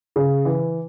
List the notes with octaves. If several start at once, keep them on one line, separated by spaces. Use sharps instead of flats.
C#3
E3